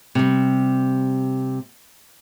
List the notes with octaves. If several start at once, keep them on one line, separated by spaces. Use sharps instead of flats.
C3 G3